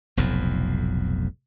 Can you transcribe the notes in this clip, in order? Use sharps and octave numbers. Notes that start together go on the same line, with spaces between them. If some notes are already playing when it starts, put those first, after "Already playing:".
F1 B1 F2 A2